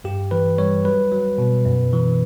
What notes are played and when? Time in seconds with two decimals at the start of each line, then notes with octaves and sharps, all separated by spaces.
0.04 G2 G4
0.31 E3 B4
0.58 G3 C#5
0.85 F#3 B4
1.12 F#3
1.38 B2
1.65 F#2
1.93 E3